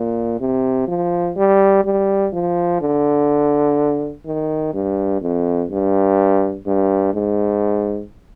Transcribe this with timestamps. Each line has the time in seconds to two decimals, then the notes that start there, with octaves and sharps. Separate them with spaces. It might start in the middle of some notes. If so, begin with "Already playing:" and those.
Already playing: A#2
0.40 C3
0.88 F3
1.37 G3
1.84 G3
2.33 F3
2.81 D3
4.26 D#3
4.74 G2
5.22 F2
5.70 G2
6.66 G2
7.14 G#2